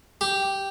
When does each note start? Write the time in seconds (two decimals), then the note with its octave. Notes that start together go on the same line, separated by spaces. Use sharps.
0.21 G4